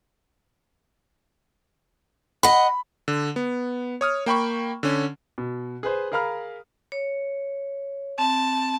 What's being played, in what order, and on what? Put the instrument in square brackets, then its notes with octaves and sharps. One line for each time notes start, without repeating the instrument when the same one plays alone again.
[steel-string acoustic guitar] D#5 F#5 [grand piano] B5
[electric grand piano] D3
B3
C#5 D#6 F6
A#3 G5 B5 C#6
D3 C#4
[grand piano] B2
G#4 B4 C5
G#4 A#4 F5 A#5 B5 F6
[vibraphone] C#5
[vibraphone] C4 [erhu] A5